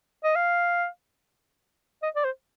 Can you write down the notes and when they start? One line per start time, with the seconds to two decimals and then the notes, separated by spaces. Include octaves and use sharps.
0.24 D#5
0.36 F5
2.03 D#5
2.16 D5
2.24 C5